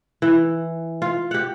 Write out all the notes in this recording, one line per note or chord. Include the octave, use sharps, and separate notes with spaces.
E3
F4
G4 F#5